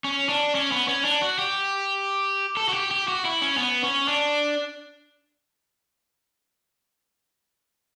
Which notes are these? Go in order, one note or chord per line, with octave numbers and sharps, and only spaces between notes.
C#4
D4
C#4
B3
C#4
D4
F#4
G4
A4
F#4
G4
G4
F#4
E4
C#4
B3
C#4
D4